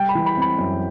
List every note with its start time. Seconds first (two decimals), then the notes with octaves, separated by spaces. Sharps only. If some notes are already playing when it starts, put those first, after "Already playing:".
Already playing: G3 G5
0.09 B5
0.15 E3
0.26 B5
0.37 C4 B5
0.58 F#2